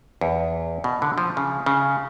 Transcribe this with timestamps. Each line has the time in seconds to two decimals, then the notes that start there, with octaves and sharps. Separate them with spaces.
0.21 E2
0.84 B2
1.02 D3
1.18 F3
1.37 C#3
1.66 C#3